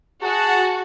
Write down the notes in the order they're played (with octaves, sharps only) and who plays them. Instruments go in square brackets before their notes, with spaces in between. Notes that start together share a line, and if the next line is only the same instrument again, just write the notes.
[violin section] F#4 [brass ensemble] G#4 F#5 A5